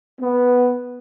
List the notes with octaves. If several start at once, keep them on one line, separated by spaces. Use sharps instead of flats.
B3